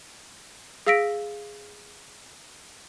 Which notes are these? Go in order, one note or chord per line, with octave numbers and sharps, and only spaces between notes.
G#4 F5 E6 A#6 B6 D7